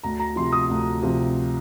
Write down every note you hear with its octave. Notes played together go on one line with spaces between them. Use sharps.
D2 A#5
A#5
C3 F3 C6
D#6
D2
C3 F3